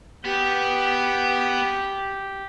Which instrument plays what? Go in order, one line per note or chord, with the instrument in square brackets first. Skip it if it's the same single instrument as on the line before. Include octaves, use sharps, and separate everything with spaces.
[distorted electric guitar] B3 [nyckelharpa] G4